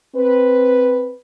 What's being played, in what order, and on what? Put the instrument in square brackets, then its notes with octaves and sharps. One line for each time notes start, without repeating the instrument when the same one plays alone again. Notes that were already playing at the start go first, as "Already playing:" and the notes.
[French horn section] C4 B4